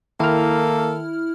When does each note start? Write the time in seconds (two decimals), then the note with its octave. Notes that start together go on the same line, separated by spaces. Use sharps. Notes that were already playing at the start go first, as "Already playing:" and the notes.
0.20 D#3 A#3 E4 A4 F6